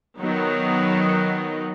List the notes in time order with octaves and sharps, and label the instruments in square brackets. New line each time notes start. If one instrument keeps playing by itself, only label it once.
[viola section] D#3 F#3 B3 D#4 F#4